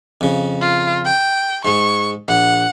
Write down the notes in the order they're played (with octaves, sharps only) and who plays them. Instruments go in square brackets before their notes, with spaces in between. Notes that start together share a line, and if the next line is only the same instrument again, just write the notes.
[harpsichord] F2 C#3
[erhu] F4
G5
[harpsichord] G#2 G#3 [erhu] C#6
[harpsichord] A#1 [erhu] F#5